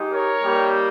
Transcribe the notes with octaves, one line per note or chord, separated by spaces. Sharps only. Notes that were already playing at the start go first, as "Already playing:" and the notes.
Already playing: G#3 D#4 G4
A#4 C#5
G3 A#3 D#4 G4